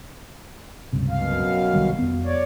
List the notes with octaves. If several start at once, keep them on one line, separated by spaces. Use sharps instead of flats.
C#2 G2 C3
F#2 B2 F5
C2 D#3 G3
F2 B3
C#5 D5